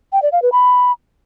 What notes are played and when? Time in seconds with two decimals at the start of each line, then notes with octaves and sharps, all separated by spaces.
0.12 G5
0.22 D5
0.32 F5
0.42 B4
0.52 B5